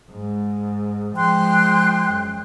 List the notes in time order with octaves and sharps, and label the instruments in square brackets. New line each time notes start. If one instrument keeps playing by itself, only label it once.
[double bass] G#2
[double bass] F3 G#3 [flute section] G5 C6 F#6
[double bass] F#2